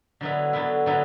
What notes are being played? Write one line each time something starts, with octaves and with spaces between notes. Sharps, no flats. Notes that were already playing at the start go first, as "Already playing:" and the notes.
D3 F#3 B3 E4
D3 F#3 B3 E4
D3 F#3 B3 E4